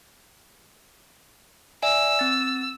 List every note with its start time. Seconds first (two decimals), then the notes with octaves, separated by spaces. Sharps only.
1.83 D5 E5 G#5 E6
2.19 C4 A6